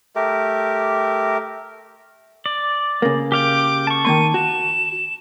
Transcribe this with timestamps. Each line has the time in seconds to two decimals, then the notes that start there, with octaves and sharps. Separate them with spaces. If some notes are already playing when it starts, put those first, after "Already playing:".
0.16 A3 G4 A#4
2.46 D5
3.02 C#3 A#3
3.32 G4 F5 G5 D6
3.87 A5 C#6
4.05 D#3 A#3 C6 D#7
4.34 F#4 E7